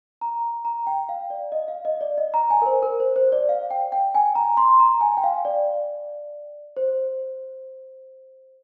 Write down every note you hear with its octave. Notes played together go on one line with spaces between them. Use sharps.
A#5
A#5
G5
F5
D5
D#5
F5
D#5
D5
D#5
A#5
G#5
A#4
C5
A#4
C5
C5
D5
F5
G5
G5
G#5
A#5
C6
A#5
G#5
G5
F5
D5
C5